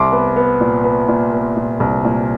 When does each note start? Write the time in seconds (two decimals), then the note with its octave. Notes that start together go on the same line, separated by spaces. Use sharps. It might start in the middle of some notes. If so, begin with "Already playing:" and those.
Already playing: C2 C6 D6
0.12 B3
0.36 B3
0.61 A#2
0.84 B3
1.08 A#2
1.33 B3
1.57 A#2
1.80 C2
2.05 A#2